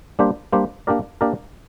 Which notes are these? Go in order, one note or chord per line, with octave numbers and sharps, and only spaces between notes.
G3 A#3 D4 G4 C5
G3 A#3 D4 G4 C5
A#3 D4 G4 A#4 D5
A#3 D4 G4 A#4 D5